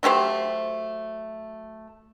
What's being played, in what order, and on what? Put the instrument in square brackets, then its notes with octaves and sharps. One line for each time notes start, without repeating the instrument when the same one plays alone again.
[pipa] F#3 A3 G4 C5